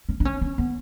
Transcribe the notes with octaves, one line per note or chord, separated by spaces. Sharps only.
C#4
D4
C#4
C#4
B3